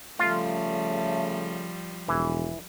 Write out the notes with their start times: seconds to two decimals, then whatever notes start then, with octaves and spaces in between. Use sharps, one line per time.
0.19 C#3 F3 G3 A3 F4
2.08 E1 E3